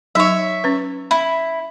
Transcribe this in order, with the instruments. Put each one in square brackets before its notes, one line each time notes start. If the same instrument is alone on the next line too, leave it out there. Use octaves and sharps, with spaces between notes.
[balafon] F#3 D#4 [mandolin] C#5 E5
[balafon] C#4 B4
[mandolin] E4 [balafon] B5